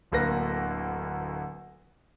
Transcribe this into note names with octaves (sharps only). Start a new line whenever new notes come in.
D1 D2 A#3 B4 A#6